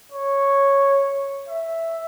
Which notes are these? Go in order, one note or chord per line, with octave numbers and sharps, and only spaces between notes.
C#5
E5